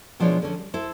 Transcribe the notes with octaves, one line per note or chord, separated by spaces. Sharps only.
B2 F3 G#3 D4 E4 C#5
D3 C#4
G3
E4 A4 C5